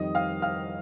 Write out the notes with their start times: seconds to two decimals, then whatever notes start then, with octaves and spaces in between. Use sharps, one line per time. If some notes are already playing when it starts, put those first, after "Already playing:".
Already playing: F2 D#3 G3 D#5 D#6
0.15 F5 F6
0.42 F5 F6